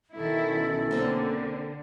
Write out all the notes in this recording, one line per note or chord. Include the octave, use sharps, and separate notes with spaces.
B1 D#3 C#4 E4 A4
D3 A#3 C4 G#4